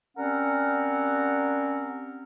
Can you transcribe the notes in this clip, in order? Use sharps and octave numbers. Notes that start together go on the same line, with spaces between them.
G3 C4 C#4 A#4 F#5